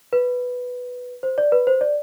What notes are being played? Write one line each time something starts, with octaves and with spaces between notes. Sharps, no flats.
B4
C5
D5
B4
C5
D5